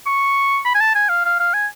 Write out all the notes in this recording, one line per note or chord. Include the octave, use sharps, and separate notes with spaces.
C#6
B5
G#5
A5
G#5
F5
F5
F5
G#5